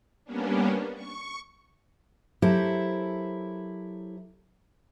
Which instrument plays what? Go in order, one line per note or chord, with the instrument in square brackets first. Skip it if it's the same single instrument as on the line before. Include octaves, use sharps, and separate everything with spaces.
[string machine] G3 A#3 B3 C#4 D4
C#6
[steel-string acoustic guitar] F#3 E4 G4 A4 A#4 C5